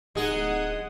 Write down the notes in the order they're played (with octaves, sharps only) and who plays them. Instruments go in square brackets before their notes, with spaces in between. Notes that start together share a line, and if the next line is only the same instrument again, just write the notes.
[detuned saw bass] D1 [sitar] G#3 G#4 [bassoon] D#4 [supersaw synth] F#5 D#6